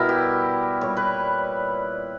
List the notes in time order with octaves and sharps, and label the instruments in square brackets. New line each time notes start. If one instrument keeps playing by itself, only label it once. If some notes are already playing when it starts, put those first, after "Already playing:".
Already playing: [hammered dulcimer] B2 G3 E4 A#4
G4
A#2 G3 C#5
B4